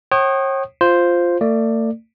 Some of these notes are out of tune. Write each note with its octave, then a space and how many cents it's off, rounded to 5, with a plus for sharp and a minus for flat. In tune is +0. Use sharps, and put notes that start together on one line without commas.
C#5 -40 G5 -35 D#6 -20
F4 +0 C5 +0
A3 +40 D5 +15